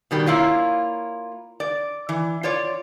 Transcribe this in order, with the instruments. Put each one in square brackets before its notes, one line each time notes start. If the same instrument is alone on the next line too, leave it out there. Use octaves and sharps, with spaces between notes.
[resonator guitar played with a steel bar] B2 D#3 G3
A#3 E4 F4 C#5
D5
E3
F4 C#5 D5